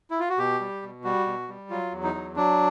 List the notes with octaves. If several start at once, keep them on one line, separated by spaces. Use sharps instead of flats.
E4
F4
F#4
B2 G4
G3
B2
G3 F#4
B2
G3
F#3 F4
E2
D#4
F#3
F#3 D4